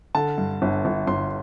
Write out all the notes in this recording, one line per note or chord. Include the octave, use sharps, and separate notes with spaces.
D3 A5
G2
G1
G1
G1 C6